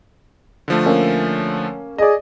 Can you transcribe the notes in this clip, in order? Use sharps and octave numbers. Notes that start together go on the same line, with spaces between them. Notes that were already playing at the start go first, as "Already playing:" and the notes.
D3 F3 A3
A#3 C#4
G#4 D5 D#5